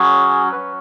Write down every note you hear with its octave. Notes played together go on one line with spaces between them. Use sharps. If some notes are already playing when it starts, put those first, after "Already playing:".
Already playing: F#3 C#4 F#4 G#4
F#3 C#4 F#4 B4